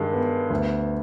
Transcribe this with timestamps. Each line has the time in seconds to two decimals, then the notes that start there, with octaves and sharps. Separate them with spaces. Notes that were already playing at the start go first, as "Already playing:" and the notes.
Already playing: G2 D#3 G#3
0.14 B3
0.50 D2